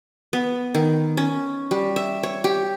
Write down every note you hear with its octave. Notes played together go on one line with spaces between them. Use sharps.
B3
D#3
C#4
G3
E5
C#5
G4